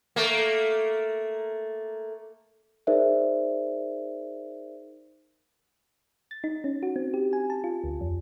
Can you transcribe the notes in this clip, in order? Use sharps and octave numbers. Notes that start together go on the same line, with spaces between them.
A3 A#3
D#4 G#4 A#4 C5 D5 E5
A6
D#4
C#4
F#4
C4
G4
G#5
A5
F4
D2
F2